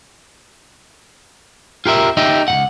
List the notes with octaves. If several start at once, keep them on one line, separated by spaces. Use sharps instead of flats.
F4 G4 A#4 E5
D#4 G4 E5
C#2 G#2 F#5